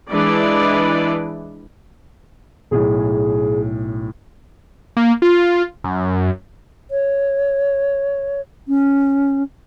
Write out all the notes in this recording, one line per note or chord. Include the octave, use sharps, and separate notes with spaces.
E3 G#3 D4 E4 B4 D5
B1 A2 G#4
A#3
F4
F#2
C#5
C#4